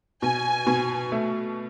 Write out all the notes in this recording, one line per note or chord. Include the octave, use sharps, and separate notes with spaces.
B2 G#5
B2
A3